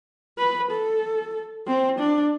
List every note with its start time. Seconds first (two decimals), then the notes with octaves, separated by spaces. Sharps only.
0.38 B4
0.71 A4
1.67 C4
1.99 D4